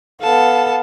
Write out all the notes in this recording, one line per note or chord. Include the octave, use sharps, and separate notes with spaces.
B3 A4 F5 A5